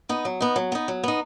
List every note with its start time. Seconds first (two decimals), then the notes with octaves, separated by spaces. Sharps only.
0.09 B3 D#4
0.25 F#3
0.41 B3 D#4
0.56 F#3
0.72 B3 D#4
0.88 F#3
1.04 B3 D#4